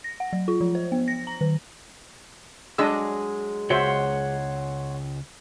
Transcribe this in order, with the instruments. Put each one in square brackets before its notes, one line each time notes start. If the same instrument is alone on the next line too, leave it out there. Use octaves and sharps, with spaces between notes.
[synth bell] A#6
F#5
F#3
F4
F3
C5
B3
A#6
A#5
D#3
[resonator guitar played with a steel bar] F#3 G#3 G#4 [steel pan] D4 D#5 E6
[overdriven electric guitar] C#2 [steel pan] F#4 C5 E5 [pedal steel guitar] C#5 F#5 C6